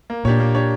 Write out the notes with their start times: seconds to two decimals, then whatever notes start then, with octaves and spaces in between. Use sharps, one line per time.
0.10 A#3
0.25 A#2 D4 G4 C#5
0.40 A#3
0.55 D4 G4 C#5